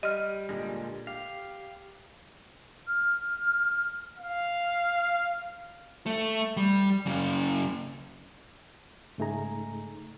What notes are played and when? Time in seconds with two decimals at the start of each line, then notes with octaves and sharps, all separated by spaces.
0.03 G3 D#5 F6
0.49 A#2 D3 G#3
1.07 G4 F5
2.87 F6
4.19 F5
6.06 A3
6.57 G3
7.06 F#2 C#3
9.18 G#2 C#3 A3 D#4 G#4 A#5